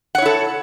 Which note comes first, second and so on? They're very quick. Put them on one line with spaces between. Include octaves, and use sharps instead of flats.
F#5 C#5 E4 A4